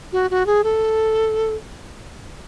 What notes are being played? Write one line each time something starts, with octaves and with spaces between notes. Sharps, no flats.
F#4
F#4
G#4
A4